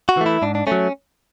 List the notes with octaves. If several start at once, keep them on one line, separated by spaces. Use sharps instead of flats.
F#4
E3 A3
E4
G#2 D4
D4
F#3 A3 C#4